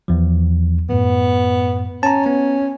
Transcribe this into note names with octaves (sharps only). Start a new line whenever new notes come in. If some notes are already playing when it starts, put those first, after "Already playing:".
E2 F3
F#2 A2 B3
C#4 A5 A#5
B3